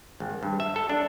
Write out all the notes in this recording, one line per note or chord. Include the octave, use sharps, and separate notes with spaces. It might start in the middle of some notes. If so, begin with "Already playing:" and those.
G#1
G2
E5
A4
D4